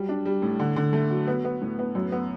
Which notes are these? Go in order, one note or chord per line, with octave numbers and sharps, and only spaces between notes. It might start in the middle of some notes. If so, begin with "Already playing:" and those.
Already playing: F#3 G3
D4
G3
A2
D3
D3
A3
F#3
B3
B3
A2
B3
F#2
B3